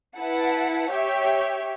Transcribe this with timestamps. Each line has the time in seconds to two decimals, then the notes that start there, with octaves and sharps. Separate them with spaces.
0.18 E4 B4 F#5 A5
0.91 G4 C#5 E5 G5